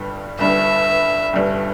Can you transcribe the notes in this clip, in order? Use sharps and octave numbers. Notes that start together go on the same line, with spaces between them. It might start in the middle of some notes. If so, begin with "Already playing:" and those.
Already playing: G1 G2 G3
G1 G2 G3 E5
G1 G2 G3